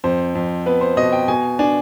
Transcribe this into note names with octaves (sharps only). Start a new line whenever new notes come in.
F2 C5
F2
B3 B4
C5
B2 D#5
G5
B2 G#5
D4 G#5